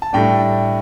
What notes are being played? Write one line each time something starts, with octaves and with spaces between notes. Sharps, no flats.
A5
A2 G3 D4 G5